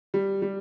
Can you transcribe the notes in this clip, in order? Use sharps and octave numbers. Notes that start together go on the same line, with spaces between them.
G3
G3